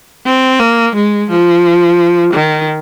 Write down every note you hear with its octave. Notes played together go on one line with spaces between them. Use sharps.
C4
A#3
G#3
F3
D#3